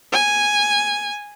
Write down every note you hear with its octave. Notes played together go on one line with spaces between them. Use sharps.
G#5